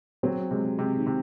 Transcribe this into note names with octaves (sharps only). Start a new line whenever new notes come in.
F#3 C4
C3 G#3
C3 G#3
D#3
C3